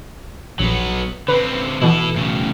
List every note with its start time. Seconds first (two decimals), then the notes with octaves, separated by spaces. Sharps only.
0.59 A#1 F#3 B3 C#7
1.28 D3 C4 B4
1.81 B2 E3 E4 A4
2.16 A2 C#3